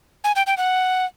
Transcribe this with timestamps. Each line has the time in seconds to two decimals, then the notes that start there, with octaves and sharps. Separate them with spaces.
0.24 G#5
0.36 G5
0.47 G5
0.57 F#5